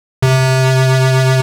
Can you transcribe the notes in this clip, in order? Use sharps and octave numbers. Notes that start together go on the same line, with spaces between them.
C3